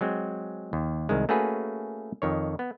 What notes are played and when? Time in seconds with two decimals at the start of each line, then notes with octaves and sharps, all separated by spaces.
0.01 F#3 G#3 C4
0.73 D#2
1.09 C2 D#3 G#3
1.29 A3 A#3 C#4 F#4 G#4 B4
2.22 F2 D#3 C#5
2.59 B3